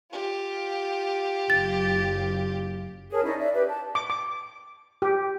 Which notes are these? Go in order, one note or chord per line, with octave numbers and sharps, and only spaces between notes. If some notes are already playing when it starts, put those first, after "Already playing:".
F4 G4
F#1 A6
G#4 A#4 C#5 A5
C#4 D#4 E4 D5
D5 E5
G4 B4
A5
D6
D6
G4